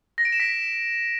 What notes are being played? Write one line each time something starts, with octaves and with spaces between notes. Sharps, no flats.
A#6
D7
E7
B6